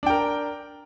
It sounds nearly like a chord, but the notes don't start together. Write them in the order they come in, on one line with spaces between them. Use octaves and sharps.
D4 G5 A#4